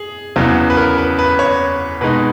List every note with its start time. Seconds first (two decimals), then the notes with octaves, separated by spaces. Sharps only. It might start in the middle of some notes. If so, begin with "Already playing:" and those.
Already playing: G#4
0.36 E2 C#3 F#3 B3
0.70 B4
0.77 A#4
0.98 B4
1.19 B4
1.39 C#5
2.01 B2 G#3 D#4 B4